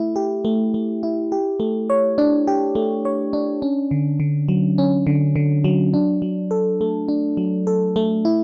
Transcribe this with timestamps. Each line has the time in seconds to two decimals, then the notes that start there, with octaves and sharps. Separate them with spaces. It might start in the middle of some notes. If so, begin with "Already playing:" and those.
Already playing: A3 E4
0.16 G4
0.45 A3
0.74 A3
1.03 E4
1.32 G4
1.60 A3
1.90 C#5
2.18 D4
2.47 G4
2.75 A3
3.05 C#5
3.33 D4
3.62 C#4
3.91 D3
4.20 D3
4.48 F#3
4.78 C#4
5.07 D3
5.36 D3
5.64 F#3
5.94 D4
6.22 F#3
6.51 A4
6.81 A3
7.08 D4
7.37 F#3
7.67 A4
7.96 A3
8.25 E4